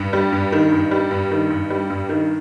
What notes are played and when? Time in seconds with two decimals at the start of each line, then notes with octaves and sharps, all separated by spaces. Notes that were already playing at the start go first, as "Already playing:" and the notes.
Already playing: G2
0.13 G3
0.32 G2
0.52 D#3
0.72 G2
0.91 G3
1.11 G2
1.31 D#3
1.50 G2
1.70 G3
1.90 G2
2.09 D#3